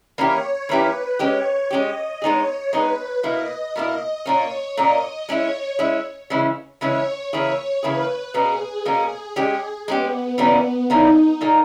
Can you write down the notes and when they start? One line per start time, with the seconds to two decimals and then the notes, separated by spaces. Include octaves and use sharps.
0.18 E3 A#3 C#4 E4 G4 C#5
0.68 E3 A#3 C#4 E4 G4 B4
1.19 G#3 C#4 G4 C#5
1.71 G#3 C#4 G4 D#5
2.21 G#3 B3 D#4 G#4 C#5
2.73 G#3 B3 D#4 G#4 B4
3.23 B2 A#3 E4 D#5
3.76 B2 A#3 E4 D#5
4.26 A#2 A#3 C#4 C#5
4.77 A#2 A#3 C#4 D#5
5.28 G#3 C#4 E4 C#5
5.79 G#3 C#4 E4
6.30 C#3 E3 G#3 C#4 E4
6.81 C#3 E3 G#3 C#4 E4 C#5
7.32 C#3 E3 A#3 E4 G#4 C#5
7.83 C#3 E3 A#3 E4 G#4 B4
8.34 B2 A#3 C#4 G#4
8.85 B2 A#3 C#4
9.36 G#3 C#4 G4
9.87 G#3 B3 C#4 G4
10.38 C#3 E3 G3 A#3 B3 C#4
10.89 C#3 E3 G3 A#3 C#4 D#4
11.41 A#2 A#3 D#4 G#4